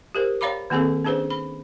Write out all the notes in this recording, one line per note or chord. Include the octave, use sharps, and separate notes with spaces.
G4 A#4 C5
C#5 D5 F5 A#5 B5 D6
D#3 A#3 C4 G#4 A4
C#4 D4 G#4 B4 C5
B5